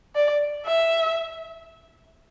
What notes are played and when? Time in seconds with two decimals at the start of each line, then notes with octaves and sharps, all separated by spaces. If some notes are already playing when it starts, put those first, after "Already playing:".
0.15 D5
0.66 E5